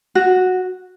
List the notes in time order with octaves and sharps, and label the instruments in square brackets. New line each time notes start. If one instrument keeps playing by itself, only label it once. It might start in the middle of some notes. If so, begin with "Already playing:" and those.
[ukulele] F#4